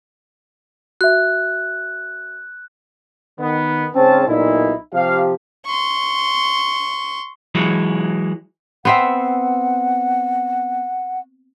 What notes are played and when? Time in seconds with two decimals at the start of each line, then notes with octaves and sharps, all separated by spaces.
1.01 F#4 E5 F#6
3.40 D#3 B3
3.95 G#2 C#3 C4 C#4 C5 A5
4.28 B1 A#2 D#4 E4
4.94 C3 F3 G4 F5
5.66 C6 C#6
7.55 E3 F#3 G#3
8.85 B3 C4 E5 F#5